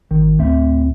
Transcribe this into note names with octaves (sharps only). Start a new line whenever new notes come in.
G#1 D#3
D2 A2 C4 E5